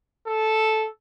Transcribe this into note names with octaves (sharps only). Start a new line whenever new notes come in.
A4